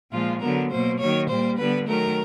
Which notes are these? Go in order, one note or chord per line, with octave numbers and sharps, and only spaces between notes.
A#2 F3 G#3 F4
D3 F#3 B3 A#4
B2 F#3 A#3 C5
D#3 F#3 A#3 C#5
A#2 G3 A#3 C5
D3 G3 B3 B4
D#3 F#3 A3 A#4